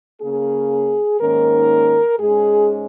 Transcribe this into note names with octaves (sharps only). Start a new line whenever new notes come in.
C#3 A#3 C#4 G#4
G#2 D#3 A#3 C#4 A#4
G#2 G#3 C#4 G#4